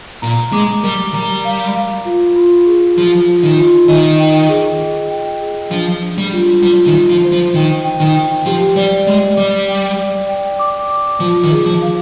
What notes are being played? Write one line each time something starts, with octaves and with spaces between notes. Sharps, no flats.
A#2 A#5
G#3 D6
G3 A#4
G3 A#5
F5
F5
F4
F4
G#4
F3 F4
F4
D#3
F4
D#3 D#5
G5
G#4
G#4
G5
G#4
F3 D4
D4
G3
F4
G3 F4
D#3
F4
F3
C5
F3
D#3 G5
G5
D#3
G5
F3 G4
G3 D5
G#3 D5
G3 D6
G5
D5
G5
D6
D6
F3 F4
D#3
G#4
F3
F5